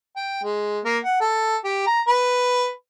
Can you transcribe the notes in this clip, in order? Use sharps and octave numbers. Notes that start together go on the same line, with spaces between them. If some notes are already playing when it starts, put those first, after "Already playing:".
G5
G#3
A#3
F#5
A4
G4
A#5
B4